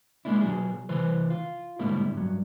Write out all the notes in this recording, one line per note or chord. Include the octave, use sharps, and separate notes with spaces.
G#3 A#3 D4 E4
B2 F#3 G#4
C3 E3 B4 C5
F4
G#2 B2 D3 G3 A#3 E4
G2 F#3